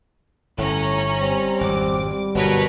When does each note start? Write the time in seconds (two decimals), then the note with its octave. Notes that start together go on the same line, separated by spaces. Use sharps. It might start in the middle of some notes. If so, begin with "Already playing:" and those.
0.58 G1 A2 C#4 A#5
1.21 G3 C4
1.61 G#1 F2 D6
2.03 G3
2.35 G1 F#2 B2 A#4 B4 C#5